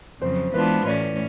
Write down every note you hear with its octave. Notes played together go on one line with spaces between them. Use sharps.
F2 C#3 F#3 C5
E3 G#3 B3 D4 F4 B4
A2 E3 A3 C#4 D5